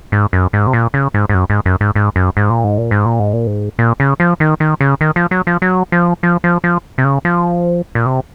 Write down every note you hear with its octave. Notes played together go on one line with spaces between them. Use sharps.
G#2
F#2
G#2
C3
A#2
C#3
G#2
G#2
F#2
G#2
F#2
G#2
G#2
F#2
G#2
A#2
G#2
A#2
G#2
A#2
G#2
A#2
G#2
A#2
C#3
F3
D#3
D#3
C#3
D#3
F3
F#3
F3
F#3
F3
F3
F3
F3
C3
C#3
F3
A#2
C3